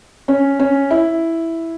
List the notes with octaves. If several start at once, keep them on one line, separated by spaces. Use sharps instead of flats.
C#4
C#4
E4